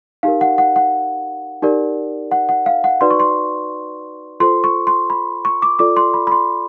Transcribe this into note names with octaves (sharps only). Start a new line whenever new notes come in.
D#4 G4 A#4 F5
F#5
F#5
F#5
D#4 G4 A#4 D5
F#5
F#5
F5
F#5
D#4 F#4 B4 D5 C6
C#6
C6
F4 A4 C5 C6
C#6
C6
B5
C#6
D6
F4 A4 D5 D6
C6
B5
B5
C6